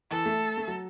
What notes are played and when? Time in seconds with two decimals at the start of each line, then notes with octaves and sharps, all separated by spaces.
0.11 E3 A4
0.25 A3
0.57 A3
0.68 F#3